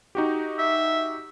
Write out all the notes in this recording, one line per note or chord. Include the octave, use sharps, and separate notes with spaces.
D#4 F#4 G4
E5